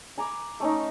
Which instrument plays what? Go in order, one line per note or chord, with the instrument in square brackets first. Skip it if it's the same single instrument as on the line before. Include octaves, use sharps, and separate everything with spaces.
[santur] G#5 A#5 B5 D6
A3 C#4 D#4